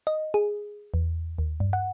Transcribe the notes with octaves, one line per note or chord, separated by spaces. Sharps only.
D#5
G#4
E2
D#2
G2
F#5